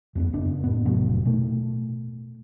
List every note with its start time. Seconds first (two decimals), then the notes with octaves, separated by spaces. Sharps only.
0.15 F2 A#3 B3
0.33 F#1 D4
0.64 A2 B3
0.86 F1 A2 F#3
1.25 B2 A3